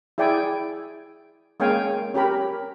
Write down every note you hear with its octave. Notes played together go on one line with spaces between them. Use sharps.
E4 G#4 D5 G5 G#5
G#3 A#3 C#4 F5 G5 G#5
C#4 G4 A#4 B5